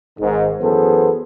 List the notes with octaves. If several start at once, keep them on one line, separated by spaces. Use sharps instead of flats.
G#1 G#2 D#3
F#2 E3 B3 G#4 A4 C5